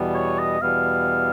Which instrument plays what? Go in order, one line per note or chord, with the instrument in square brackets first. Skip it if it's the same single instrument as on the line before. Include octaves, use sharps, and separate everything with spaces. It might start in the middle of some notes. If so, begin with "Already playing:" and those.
Already playing: [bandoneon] E2 B2 G3 B3
[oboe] C#5
D#5
[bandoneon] E2 B2 G3 B3 [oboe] F5